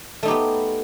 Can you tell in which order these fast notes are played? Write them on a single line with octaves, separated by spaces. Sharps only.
A3 D#4 G4 B3